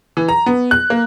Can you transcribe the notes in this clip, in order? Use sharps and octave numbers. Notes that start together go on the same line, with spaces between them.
E3
A#5
B3
F#6
A#3